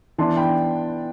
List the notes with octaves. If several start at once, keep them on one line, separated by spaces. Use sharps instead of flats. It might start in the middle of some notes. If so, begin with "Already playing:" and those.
E3 B3 D4 A5 C6
G5 B5